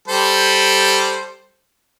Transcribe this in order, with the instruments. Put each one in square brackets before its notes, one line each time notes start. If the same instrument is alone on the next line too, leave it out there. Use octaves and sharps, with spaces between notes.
[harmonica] G3 A4 C5